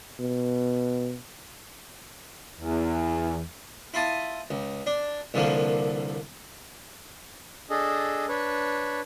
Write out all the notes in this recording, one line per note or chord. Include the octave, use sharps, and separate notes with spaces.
B2
E2
E4 F4 A5 D#6
C#2
D4
C2 G2 D3 F3 A#3
D4 G#4 A4 D#5
D4 B4 C#5